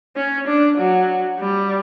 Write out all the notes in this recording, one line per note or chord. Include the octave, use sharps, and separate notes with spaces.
C#4
D4
F#3
G3